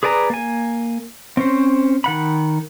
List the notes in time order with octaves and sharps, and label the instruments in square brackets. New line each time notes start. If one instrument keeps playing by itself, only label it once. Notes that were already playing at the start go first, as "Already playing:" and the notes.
[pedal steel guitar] G#4 B4 D5 G#5 A#5
A#3 G#5
C4 C#4 C5
D#3 F#5 B5